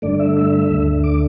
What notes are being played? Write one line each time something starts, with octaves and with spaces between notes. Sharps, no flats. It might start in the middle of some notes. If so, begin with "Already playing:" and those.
G2 D3 A3 D5
E5
E5
D2 D3 A3
D6